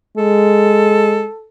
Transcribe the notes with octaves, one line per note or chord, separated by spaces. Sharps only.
G#3 A4